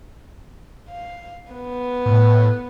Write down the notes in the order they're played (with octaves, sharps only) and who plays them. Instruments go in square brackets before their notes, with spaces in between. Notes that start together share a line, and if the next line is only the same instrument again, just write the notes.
[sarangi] F5
B3
[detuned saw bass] A2